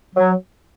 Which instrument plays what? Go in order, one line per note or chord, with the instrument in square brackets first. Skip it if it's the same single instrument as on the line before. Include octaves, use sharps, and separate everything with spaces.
[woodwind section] F#3